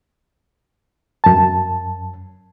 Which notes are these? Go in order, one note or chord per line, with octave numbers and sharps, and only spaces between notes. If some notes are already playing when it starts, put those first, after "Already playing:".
F#2 A5